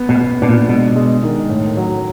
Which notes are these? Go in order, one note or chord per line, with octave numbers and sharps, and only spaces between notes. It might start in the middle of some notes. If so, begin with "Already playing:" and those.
Already playing: B3
B2
B3
B2 D4
A#2
B2 G#3
G#3
D#3
A2
F#3